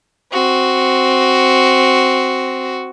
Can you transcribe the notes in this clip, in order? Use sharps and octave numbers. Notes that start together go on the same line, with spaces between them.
C4 F#4